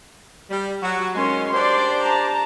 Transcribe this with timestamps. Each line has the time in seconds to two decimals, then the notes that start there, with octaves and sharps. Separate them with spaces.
0.50 G3
0.82 F#3 F#4
1.15 D#3 G#3 C#4 C6
1.53 D4 G4 C5 D5 C6
2.02 A5 A#5